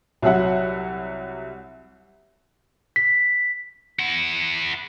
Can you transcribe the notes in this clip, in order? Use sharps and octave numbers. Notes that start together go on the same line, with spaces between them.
C2 F#3 E5 F#5
B6
E4 F#5